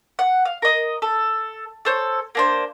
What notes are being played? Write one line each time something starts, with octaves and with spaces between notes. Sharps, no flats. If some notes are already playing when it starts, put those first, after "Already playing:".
F#5
F5
A#4 D#5
A4
A4 C5 C#5
A#3 D4 C5